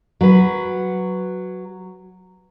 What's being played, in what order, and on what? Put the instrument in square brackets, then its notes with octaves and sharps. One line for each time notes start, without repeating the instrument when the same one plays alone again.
[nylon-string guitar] F#3 B4